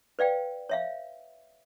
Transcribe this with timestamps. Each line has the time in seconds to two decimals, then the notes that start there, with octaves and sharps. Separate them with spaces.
0.19 B4 D5 F5 G5
0.69 C#5 E5 F5